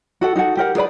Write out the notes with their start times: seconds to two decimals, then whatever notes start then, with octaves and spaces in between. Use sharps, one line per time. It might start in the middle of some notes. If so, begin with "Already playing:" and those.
0.21 F#4 A4 F#5
0.36 D#4 F#4 A4 F#5
0.57 G4 A#4 F#5
0.75 G#4 B4 D5 B5